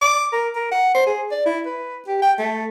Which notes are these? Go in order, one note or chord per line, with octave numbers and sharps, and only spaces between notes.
D6
A#4
A#4
F#5
C5
G#4
D5
E4
B4
G4
G5
A3